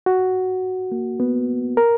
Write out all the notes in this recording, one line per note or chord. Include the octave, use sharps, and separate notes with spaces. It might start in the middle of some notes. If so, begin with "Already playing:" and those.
F#4
A#3
B3
A#4